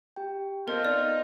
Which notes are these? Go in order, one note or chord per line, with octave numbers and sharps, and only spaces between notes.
G4 G5
B3 C4 F4 A4 A#4 D#5 G6
D#4 D5